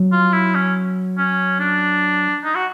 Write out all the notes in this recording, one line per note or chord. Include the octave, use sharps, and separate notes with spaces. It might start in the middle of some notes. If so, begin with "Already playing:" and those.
Already playing: F#3
F4
E4
C#4
C#4
D4
D#4
F#4